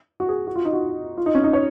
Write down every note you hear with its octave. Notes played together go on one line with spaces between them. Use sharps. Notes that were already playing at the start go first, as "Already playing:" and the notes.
F#4
G#4
F#4
F4
D#4
F#4
F4
D#4
C#4
D#4
C#5